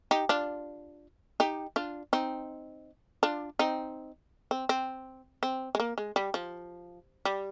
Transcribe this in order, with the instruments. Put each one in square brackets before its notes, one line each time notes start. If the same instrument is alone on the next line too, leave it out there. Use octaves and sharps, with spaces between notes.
[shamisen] D#4 G4
D4 F4
D#4 G4
D4 F4
C4 D#4
D4 F4
C4 D#4
C4
C4
C4
G#3
A#3
G#3
G3
F3
G3